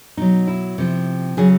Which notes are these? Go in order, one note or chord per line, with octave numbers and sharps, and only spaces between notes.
B2 F#3 D#4
E4
C3 F3
C#3 F#3 G#4